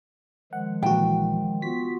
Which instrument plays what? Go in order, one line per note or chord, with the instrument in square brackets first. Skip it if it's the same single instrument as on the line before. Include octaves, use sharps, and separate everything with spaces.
[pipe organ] D#3 F3 G#3 [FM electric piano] F#5
[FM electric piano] A#1 E3 F#4 [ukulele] G5
[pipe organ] B3 F4 F#4 [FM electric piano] B6